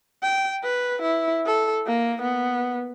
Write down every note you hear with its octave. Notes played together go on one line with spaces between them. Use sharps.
G5
B4
E4
A4
A#3
B3